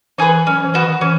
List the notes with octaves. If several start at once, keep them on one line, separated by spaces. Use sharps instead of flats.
E3 D#4 G#4 B4
F#3 C#4
E3
F#4 B4 D#5
D#3
E3 C#4